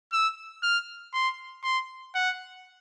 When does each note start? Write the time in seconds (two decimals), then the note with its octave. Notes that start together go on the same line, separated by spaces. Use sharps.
0.12 E6
0.63 F6
1.14 C6
1.64 C6
2.15 F#5